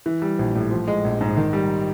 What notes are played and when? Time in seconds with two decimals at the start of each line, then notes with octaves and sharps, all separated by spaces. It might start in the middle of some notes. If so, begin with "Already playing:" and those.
0.06 E3
0.22 G3
0.39 A#1
0.55 A2
0.71 F3
0.88 G#3
1.04 A#1
1.21 G#2
1.37 D#3
1.53 G3